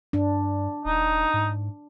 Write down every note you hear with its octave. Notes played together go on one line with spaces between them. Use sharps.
G2 D4
D#1 D#4
G#2